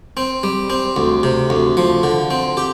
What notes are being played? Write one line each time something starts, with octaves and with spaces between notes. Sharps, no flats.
C4
G3
C4
D2
C3
D2
F3
D3
C4
G4